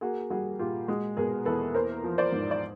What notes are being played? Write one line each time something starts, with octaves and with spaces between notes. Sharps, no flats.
A#3 F#4 G#4
G3 F#4 G#4
A#2 F4 G4
G#3 F#4 G#4
B2 G#4 A#4
E2 A4 B4
A#3 A#4 C5
F3
C5 D5
G#2
D5